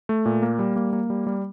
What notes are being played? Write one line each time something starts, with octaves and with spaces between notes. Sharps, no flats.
A3
A#2
A#3
G3
A#3
A#3
G3
G3